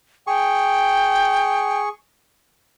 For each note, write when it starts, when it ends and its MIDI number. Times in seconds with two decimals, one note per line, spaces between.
0.27 1.89 68
0.27 1.82 79
0.27 1.89 85